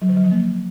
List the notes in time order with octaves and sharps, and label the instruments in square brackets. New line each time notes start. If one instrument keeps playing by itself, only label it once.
[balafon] F#3
D3
F#3
F3
A#3